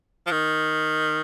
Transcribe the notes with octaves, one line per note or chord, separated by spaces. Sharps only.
F3
D#3